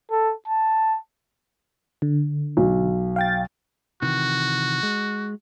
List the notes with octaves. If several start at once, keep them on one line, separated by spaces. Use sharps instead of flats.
A4
A5
D3
B1
F5 G5 A6
C3 D#3 E3 F#4
G#3